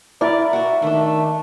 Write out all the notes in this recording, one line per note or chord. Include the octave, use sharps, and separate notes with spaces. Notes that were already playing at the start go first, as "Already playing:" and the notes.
E4 A#4 D5 E5
F#4 A#4
D#3 A3 D4